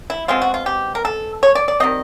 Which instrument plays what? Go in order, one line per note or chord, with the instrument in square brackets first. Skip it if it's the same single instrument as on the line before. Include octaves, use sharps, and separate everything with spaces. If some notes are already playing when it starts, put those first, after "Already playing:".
[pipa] E4
B2 G#3 C4 F4
F#4
F4
G4
A#4
A4
C#5
D5
D5
D#3 G3 C4 D#5